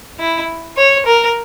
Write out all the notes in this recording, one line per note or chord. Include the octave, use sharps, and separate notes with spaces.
E4
C#5
A#4